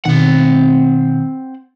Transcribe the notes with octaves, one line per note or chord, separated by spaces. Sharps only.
B2 D#3 C4 F#5